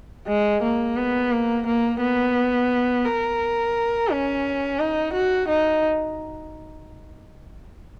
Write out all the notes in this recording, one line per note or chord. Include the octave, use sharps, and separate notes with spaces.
G#3
A#3
B3
A#3
A#3
B3
A#4
C#4
D#4
F#4
D#4